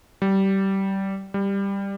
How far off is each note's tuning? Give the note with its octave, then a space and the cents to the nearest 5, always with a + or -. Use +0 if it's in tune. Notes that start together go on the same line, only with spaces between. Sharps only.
G3 -20
G3 +10